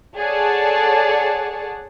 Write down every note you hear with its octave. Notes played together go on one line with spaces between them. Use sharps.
G#4 A4 C#5 D5 F#5 A5